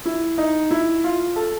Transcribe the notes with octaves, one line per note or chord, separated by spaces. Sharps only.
E4
D#4
E4
F4
A4